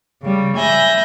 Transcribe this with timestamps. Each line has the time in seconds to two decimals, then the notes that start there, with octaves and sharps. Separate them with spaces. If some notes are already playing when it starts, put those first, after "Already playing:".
0.22 C#3 G3
0.56 E5 G#5 B5 G6 A#6